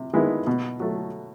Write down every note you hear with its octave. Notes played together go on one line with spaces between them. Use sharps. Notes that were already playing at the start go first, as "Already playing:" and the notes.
Already playing: C3
D#3 G#3 B3 E4
B2
F#3 A3